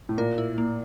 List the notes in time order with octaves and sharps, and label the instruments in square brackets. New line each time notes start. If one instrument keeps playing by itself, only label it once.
[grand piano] A2
[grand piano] A#2 [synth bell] A#4
[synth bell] E4
A#3